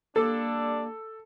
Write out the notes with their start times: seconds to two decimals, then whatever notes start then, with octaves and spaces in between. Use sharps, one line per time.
0.16 G3 A#3 D4 A4